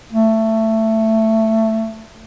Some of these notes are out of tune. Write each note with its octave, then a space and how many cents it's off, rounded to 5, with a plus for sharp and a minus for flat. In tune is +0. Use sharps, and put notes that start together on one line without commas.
A3 +15